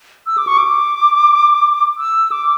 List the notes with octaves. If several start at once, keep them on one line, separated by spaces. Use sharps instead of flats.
E6
D6
C#6
D6
E6
D6